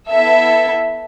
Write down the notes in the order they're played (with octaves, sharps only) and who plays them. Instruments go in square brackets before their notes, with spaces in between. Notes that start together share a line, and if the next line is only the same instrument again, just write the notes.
[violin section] B3 E4 A4 E5